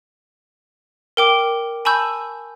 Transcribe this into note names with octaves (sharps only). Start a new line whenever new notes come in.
A#4 G5 D6
G#5 A5 B5 C#6 E6 G6